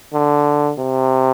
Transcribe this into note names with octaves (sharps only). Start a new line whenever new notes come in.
D3
C3